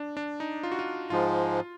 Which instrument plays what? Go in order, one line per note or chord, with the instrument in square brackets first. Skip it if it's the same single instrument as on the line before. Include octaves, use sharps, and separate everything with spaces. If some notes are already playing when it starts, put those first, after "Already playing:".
Already playing: [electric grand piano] D4
D4
D#4
F4
F#4
F4
[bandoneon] G#2 F3 G#3 [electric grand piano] F4